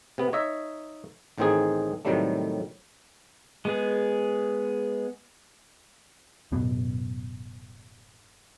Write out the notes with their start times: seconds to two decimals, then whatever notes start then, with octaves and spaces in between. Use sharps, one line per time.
0.18 C3 B3
0.33 D#4 C#5 D#5 E5
1.38 A1 A2 D#3 C4 D#4 G#4
2.05 A2 C3 D#3 F#3 G3 A3
3.65 G#3 B3 G#4
6.52 D1 F#2 B2 B3